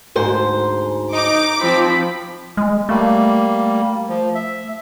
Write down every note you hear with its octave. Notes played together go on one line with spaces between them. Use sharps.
D2 G#2 C5
D#4 D6
F3 C4 B5
G#3
G3 A3 A#3
F3
E5